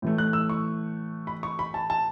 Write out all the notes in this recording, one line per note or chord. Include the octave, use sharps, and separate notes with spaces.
A2 E3 A3
F#6
E6
C#6
B5
C#6
B5
A5
A5